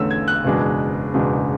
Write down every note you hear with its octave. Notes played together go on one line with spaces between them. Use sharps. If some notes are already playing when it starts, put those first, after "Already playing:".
Already playing: E2 D3 A3 C#4 E6
G#6
F#6
F#1 E2 B2 G#3 D4
F#1 E2 B2 G#3 D4